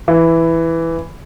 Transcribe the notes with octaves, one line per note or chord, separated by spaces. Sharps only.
E3